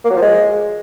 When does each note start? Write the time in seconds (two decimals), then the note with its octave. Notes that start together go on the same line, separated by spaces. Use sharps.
0.05 A#3
0.10 F#3
0.16 F3
0.22 G#3